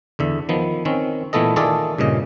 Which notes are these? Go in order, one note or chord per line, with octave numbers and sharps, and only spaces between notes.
E2 D3 E5
D#3 F3 B3
D#3 C4 C#4
A#2 E3 A3 B3 A4 D#5
D#3 A3 F4 G#4 A4 D5
G2 A#2 C#3 D#5